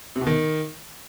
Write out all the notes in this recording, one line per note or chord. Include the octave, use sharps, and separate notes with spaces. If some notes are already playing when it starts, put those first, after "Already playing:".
C3
B2
D#3